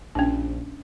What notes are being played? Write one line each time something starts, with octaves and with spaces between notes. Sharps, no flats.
A#1 C#4 D4